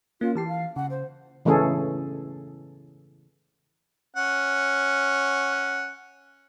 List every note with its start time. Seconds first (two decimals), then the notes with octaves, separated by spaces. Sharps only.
0.21 A#3 C#4 F4
0.35 E3 G4 A5 C7
0.48 F5
0.76 C#3 F#5
0.90 C5
1.45 C#3 E3 A3 C#4 G#4 A4
4.16 C#4 F#5